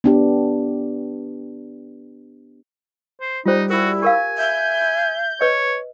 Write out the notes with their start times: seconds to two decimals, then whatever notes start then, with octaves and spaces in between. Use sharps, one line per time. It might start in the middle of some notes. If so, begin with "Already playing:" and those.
0.04 B3 D4 G4
3.21 C5
3.46 G3 D#4 F4 C5
3.70 E4 F#4 A#4
4.02 G4 A#4 F5 G#5
4.38 E5 G6
5.41 B4 C#5 D#5